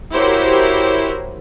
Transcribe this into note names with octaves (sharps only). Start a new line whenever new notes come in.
E4 F#4 G4 A#4 C5 C#5